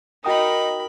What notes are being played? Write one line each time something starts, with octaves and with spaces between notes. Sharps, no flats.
D#4 F#4 A#4 G5 B5 D#6